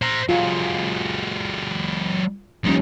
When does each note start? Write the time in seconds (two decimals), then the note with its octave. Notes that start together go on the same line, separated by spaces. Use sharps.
0.02 C5 A#5
0.29 F#3 G#3 F4
2.64 D2 F3 G3 C#4 D#4